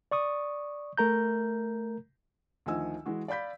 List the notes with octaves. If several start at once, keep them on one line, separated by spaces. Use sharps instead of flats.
D5 C#6 D#6
A3 A#4 A#5 G6
D2 D#3 F3 D#5 G#5 E6
E3 G#3 F#4
D5 F5 B5 G6 B6